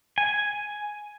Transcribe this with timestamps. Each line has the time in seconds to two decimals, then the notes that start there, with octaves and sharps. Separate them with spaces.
0.18 G#5